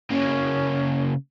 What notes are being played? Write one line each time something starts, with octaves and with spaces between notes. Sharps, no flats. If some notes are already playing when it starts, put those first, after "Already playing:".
C#3 A#3 C#4